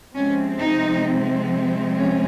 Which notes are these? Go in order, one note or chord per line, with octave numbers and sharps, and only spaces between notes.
C3 F3 G#3 C4 C#4
D#4
C#4